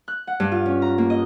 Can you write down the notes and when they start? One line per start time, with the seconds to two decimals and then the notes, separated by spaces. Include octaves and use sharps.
0.08 F#6
0.27 F#5
0.40 G2
0.52 F4
0.66 C#4
0.82 A#5
0.98 A#3
1.10 D#5